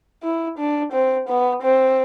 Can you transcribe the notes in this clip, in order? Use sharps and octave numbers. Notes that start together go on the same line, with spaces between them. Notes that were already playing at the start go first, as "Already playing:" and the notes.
E4
D4
C4
B3
C4